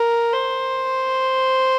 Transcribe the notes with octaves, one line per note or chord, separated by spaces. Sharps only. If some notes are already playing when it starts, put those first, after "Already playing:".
Already playing: A#4
C5